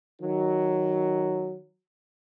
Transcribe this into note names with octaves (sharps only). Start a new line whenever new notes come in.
D#3 F#3